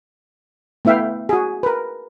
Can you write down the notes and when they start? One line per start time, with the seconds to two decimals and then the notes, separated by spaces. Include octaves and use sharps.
0.85 A3 B3 E4 E5 F5 G5
1.29 F#4 G#4
1.63 A#4 B4